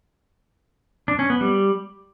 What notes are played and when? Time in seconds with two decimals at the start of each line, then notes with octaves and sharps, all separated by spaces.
1.08 D4
1.19 C#4
1.30 B3
1.41 G3